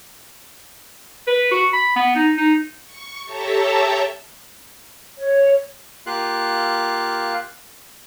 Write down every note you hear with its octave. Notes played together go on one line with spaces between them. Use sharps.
B4
F#4
B5
B3
D#4
D#4
C#6
G4 A4 C#5 E5 A5 A#5
C#5
A#3 F4 G4 F5 F#6